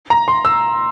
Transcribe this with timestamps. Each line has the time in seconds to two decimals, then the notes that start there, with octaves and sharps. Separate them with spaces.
0.10 A#5
0.28 C6
0.45 E6